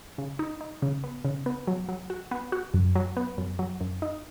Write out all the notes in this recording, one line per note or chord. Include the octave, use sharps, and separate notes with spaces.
C#3
D#4
D#4
C#3
B3
C#3
B3
F#3
F#3
F#4
B3
F#4
F#2
F#3
B3
F#2
F#3
F#2
D#4